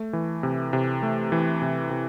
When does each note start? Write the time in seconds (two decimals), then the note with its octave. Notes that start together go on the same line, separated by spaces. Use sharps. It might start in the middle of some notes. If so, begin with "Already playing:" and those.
Already playing: A3
0.13 E3
0.43 C3
0.73 C3
1.03 A3
1.32 E3
1.62 C3
1.91 C3